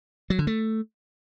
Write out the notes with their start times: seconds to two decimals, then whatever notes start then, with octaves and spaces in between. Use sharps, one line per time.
0.30 F#3
0.39 D3
0.47 A3